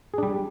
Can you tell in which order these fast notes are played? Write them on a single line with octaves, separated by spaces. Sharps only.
G#4 D4 G3